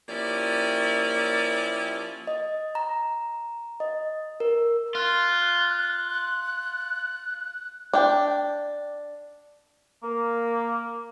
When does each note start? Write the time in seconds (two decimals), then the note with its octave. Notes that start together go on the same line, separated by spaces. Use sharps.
0.08 F3 A#3 C#4 E4 G4 D5
2.27 D#5
2.75 A#5
3.80 D#5
4.40 A#4
4.95 F4 F#6
7.94 D4 G5
10.02 A#3